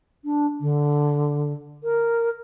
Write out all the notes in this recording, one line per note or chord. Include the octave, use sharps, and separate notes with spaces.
D4
D3
A#4